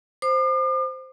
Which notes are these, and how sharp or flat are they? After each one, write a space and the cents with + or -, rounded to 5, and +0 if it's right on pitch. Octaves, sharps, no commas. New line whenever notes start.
C5 +0 D6 +45